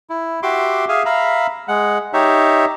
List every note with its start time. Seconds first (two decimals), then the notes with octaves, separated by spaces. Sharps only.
0.10 E4
0.43 F#4 G4 E5 C6 D6
0.89 G#4 E5 F5 G#5
1.05 E5 F5 A#5 B5
1.68 G#3 F#5
2.13 D#4 G4 C#5 E5